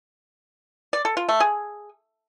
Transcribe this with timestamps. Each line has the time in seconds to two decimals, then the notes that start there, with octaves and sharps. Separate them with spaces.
0.93 D5
1.05 A4
1.17 F4
1.29 A3
1.40 G#4